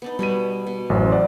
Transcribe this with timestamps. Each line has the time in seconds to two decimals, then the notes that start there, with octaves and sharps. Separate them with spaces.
0.02 B3 D4 D#4
0.19 B2 G3 C#5 B5 D#7
0.67 B2
0.90 A1 F#2 C5
1.12 D5 F#5